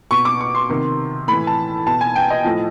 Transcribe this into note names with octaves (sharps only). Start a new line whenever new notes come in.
B2 C#6
D6
C#6
C6
C3 D#3
A2 E3 B5
A5
B2 A5
G#5
G5
D#5
A2 F3